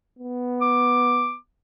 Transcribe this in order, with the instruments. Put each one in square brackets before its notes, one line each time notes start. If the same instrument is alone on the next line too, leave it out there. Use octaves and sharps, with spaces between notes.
[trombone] B3
[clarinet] D6